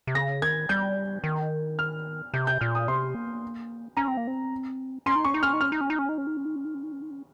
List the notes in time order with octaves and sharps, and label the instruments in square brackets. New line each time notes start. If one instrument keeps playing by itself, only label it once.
[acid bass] C3
[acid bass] C#3 [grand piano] A#6
[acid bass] D#3 [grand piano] G#6
[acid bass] G3 [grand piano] G6
[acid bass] D#3
[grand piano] F6
[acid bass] C3 [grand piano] G6
[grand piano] G6
[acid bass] A#2 [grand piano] F6
[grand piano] D#6
[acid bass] C3 [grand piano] C6
[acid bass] A#3
[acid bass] C#4 [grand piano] A#5
[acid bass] C4
A#3
C4
[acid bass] C#4 [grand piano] C6
[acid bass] D#4
[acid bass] C#4 [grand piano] C#6
[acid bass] D#4
[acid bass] C#4 [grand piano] F6
[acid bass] D#4
[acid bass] C#4 [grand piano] F6
[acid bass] D#4
C#4
D#4
C#4
D#4
C#4
D#4
C#4
D#4
C#4
D#4
C#4
D#4
C#4
D#4
C#4